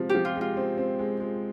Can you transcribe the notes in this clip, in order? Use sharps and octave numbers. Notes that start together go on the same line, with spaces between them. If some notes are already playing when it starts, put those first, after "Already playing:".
Already playing: C3 F3 G#3
G4
F3
F4
G#3
F4
C4
C4
G#3
G#3